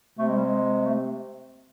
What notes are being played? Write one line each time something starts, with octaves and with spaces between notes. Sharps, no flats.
C3 A3
G#3
G3
G#3
A3